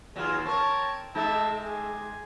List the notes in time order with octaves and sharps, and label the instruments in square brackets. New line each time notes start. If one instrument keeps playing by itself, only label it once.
[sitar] D#2 F#3 [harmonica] F4 G#4
[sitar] C4 A#4 [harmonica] C#5 A5
[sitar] C3 G#3 D#4 [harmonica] E5 A5
[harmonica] G#4